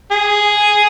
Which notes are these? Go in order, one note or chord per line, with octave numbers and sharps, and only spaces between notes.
G#4